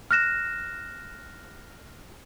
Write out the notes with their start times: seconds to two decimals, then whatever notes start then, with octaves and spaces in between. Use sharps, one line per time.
0.11 F6 F#6 A#6 E7